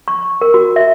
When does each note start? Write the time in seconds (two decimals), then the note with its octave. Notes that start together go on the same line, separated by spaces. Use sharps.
0.08 C#6
0.41 A#4
0.54 F#4
0.76 E5